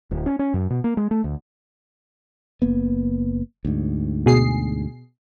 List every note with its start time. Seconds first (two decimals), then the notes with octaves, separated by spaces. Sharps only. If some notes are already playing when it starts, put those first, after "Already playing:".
0.11 D1
0.26 C#4
0.39 C#4
0.54 F#2
0.70 B2
0.84 A#3
0.97 G#3
1.11 A3
1.24 D2
2.62 F#1 A#3 B3
3.65 D2 G#2
4.26 B2 G#4 C7